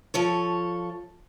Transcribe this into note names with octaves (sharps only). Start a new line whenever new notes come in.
F3 A4 C#5